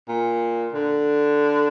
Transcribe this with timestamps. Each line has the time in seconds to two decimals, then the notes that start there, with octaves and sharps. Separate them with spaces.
0.08 A#2
0.73 D3